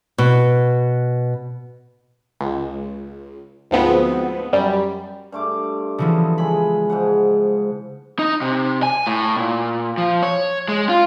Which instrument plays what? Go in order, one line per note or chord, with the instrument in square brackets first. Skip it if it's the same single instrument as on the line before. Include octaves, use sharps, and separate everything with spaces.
[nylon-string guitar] B2
[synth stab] C#2
D2 G#2 F3 B3 C4
F#2 G3
[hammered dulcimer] G2 A3 D6
[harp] C#3 E3 F3 [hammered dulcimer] B3 A4
[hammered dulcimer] G#3 G#4 [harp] B5
[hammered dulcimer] G#2 F3 F#5
[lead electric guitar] D#4
C3
G#5
A2
A#2
F3
C#5
G#3
F4